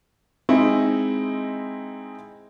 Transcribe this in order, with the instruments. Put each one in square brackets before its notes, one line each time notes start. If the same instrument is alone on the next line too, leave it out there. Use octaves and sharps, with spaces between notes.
[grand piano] G#3 C4 D#4 E4 D#5